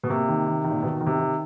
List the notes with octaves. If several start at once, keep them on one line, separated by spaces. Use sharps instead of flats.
B2
C3 A#3
D#3
D#3
D#3
A#2
B2 D#3
D#3
C3
D#3